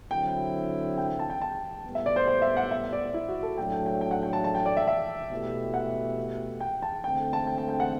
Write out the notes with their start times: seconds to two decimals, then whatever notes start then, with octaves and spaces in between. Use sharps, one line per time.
0.11 D3 F#3 C4 E4 G5
0.97 G5
1.09 G5
1.19 A5
1.30 G5
1.42 A5
1.84 A2 G3 B3
1.95 E5
2.06 D5
2.16 C5
2.28 C5
2.42 E5
2.57 F#5
2.71 E5
2.93 D5
3.14 E4
3.28 F#4
3.43 A4
3.58 A2 F#3 A3 D4 G5
3.72 G5
3.86 G5
4.01 G5
4.11 F#5
4.23 G5
4.33 A5
4.44 A5
4.55 G5
4.66 D5
4.77 E5
4.87 E5
5.31 B2 A3 E4 G4
5.74 F#5
6.60 G5
6.82 A5
7.04 D3 A3 C4 G5
7.33 A5
7.47 G5
7.58 G5
7.69 G5
7.80 F#5